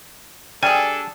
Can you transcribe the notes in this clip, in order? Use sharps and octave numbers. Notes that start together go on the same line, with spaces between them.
G3 D4 G#4 A4 D5 G5 G#5